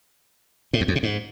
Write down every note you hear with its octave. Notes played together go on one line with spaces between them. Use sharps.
A2
E2
F2
C3
G#2